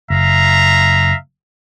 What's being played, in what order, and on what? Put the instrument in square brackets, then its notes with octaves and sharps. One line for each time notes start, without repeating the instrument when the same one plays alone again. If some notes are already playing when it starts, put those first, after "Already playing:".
[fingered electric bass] F#1 [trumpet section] E5 F5 A#5